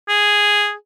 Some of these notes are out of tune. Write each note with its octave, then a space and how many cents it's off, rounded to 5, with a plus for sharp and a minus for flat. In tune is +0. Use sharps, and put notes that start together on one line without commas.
G#4 -5